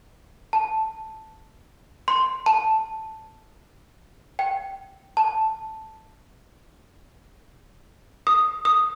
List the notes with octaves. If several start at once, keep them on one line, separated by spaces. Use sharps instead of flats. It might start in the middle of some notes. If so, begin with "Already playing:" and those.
A5
C6
A5
G5
A5
D#6
D#6